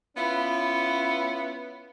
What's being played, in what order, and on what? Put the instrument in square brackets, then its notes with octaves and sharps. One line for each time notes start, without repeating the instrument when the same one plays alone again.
[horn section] B3 C#4 E4 F4 B4